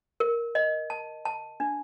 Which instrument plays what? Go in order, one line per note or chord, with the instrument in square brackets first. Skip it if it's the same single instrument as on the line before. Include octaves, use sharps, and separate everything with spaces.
[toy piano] A#4
D#5
A5
A5
D4